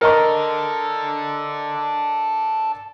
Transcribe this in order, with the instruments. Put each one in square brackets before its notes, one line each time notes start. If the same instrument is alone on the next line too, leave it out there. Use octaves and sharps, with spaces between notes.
[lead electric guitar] A4 D5 [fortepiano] A#4 D#5 C#6